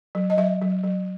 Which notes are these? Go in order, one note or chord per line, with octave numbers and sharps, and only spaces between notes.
F#3
D#5
F#3 E5
F#3
F#3